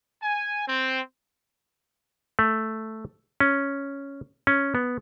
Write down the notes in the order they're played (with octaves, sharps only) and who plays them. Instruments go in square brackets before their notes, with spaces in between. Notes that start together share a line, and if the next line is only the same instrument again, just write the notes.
[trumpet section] G#5
C4
[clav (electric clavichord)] A3
C#4
C#4
B3